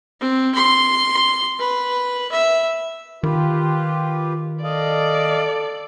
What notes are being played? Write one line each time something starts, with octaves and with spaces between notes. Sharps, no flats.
C4
C6
B4
E5
D#3 F4 G4 B4
A4 D5 D#5 F5